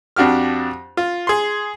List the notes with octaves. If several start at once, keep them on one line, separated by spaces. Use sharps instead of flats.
F2 D4 F#4 G4 F6
F4
G#4 C6